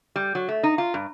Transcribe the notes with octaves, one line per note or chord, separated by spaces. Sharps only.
G3
F#3
A3
D#4
F4
G2